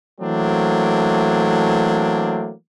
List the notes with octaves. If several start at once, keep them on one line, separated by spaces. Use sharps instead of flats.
E3 F#3 A3 A#3 C4 D4